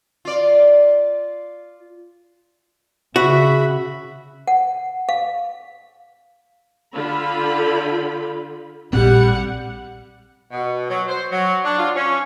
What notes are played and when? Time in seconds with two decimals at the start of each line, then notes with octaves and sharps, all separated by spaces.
0.25 F4 D5
3.16 C#3 F#4 E5 B5
4.48 F#5
5.09 F5
6.95 D3 F4 B5
8.93 A#1 A#2 G3 C4 F#5
10.52 B2
10.89 F#3
11.08 C5
11.31 F#3
11.63 D4
11.78 F4
11.96 C#4